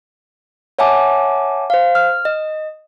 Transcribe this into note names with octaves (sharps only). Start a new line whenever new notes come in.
C#5 E5 F#5 G#5 A5 D6
C5 F5
F6
D#5